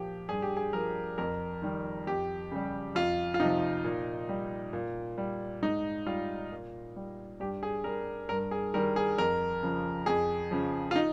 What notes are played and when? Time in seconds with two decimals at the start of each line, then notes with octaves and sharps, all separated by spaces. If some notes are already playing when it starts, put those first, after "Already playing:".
Already playing: A#2 F3 G4
0.29 G2 G#4
0.42 G4
0.57 G#4
0.73 F3 A#4
1.18 F2 A#4
1.62 D#3 G3
2.07 F2 G4
2.51 C#3 G3
2.95 F2 F4
3.34 F4
3.40 C3 F3 D#4
3.84 A#2
4.29 G3
4.73 A#2
5.18 G3
5.62 G#2 D#4
6.06 G3 F4
6.52 A#2
6.96 G3
7.40 G2 G4
7.63 G#4
7.84 G3 A#4
8.29 G2 A#4
8.51 G#4
8.74 D#3 G3 A#4
8.96 G#4
9.18 F2 A#4
9.63 C#3 F3
10.06 F2 G#4
10.51 C#3 F3
10.91 F4
10.96 D#4